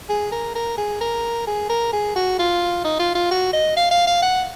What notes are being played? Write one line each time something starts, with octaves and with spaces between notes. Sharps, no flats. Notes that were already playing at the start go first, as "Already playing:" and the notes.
G#4
A#4
A#4
G#4
A#4
G#4
A#4
G#4
F#4
F4
D#4
F4
F4
F#4
D#5
F5
F5
F5
F#5